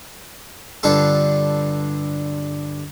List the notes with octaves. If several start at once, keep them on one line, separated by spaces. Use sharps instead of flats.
G2 D3 F4 A4